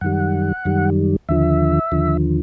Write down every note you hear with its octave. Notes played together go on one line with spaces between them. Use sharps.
F#2 D#3 G3 F#5
F#2 D#3 G3
D#2 D3 F3 E5
D#2 D3 F3